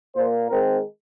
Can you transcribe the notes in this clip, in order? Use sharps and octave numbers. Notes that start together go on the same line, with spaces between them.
A#2 A#3 C5
D#3 G#3 C4 A#4